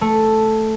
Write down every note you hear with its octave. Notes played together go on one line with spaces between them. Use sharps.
A3